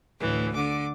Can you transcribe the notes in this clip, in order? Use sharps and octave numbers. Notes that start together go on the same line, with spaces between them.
D2 A2 E3
D3 D6